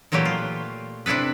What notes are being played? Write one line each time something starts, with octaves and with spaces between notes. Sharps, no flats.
A#2 E3 F#3 A3 G4
F4
C3 D4 E4 A4 B4